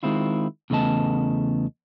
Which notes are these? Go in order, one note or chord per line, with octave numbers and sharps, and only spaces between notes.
D#3 G#3 C4 E4 F4
E2 C#3 A3 B3 D#5 A5